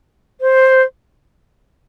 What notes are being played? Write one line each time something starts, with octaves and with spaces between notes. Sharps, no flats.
C5